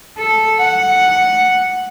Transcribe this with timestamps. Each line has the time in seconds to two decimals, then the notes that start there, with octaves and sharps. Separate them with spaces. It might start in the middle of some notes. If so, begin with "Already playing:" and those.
0.18 A4
0.59 F#5